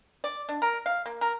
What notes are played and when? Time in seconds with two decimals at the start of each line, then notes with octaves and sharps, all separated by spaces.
0.24 D5
0.49 D4
0.62 A#4
0.86 F5
1.06 A#3
1.21 A#4